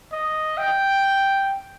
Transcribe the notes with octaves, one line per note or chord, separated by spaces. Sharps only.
D#5
G5